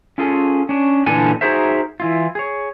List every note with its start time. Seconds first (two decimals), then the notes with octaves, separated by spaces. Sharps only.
0.18 C#4 F4 G#4 A4
0.69 C#4 D4
1.06 A#2 D3 E3 D4 A4 G#5
1.41 D#4 F#4 G#4 A#4 C5 E5
2.00 E3 E4 F4
2.35 G#4 C#5